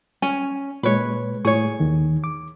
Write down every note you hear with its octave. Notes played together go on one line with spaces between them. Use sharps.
C#4 G#5
A#2 G#3 B4 C#5
A2 G#4 C#5 C#6
D#2 D#3
D6